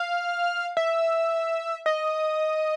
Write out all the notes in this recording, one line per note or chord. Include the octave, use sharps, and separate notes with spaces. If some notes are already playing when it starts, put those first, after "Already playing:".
Already playing: F5
E5
D#5